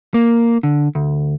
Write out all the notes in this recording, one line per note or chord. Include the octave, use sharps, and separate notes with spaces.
A#3
D3
D2